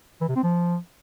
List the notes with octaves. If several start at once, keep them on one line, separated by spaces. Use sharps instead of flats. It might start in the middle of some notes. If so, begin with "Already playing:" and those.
E3
C3
C4
F3